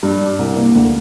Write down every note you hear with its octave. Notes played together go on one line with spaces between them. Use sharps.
G2
D4
C2
A#3
D2